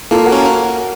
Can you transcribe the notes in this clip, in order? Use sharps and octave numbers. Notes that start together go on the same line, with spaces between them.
A#3 F4 A4
F#4 A#4
C#4